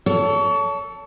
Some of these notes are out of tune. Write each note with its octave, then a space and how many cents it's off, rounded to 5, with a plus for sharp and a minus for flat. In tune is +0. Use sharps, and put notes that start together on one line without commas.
A4 +0 C#5 +35